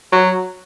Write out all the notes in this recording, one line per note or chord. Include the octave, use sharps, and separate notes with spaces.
F#3